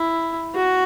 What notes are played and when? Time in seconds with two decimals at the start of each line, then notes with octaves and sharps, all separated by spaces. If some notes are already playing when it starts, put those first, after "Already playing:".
Already playing: E4
0.55 F#4